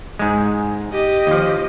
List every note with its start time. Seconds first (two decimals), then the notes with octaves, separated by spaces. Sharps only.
0.19 G#2 G#3
0.92 G4 D#5
1.27 D#2 F3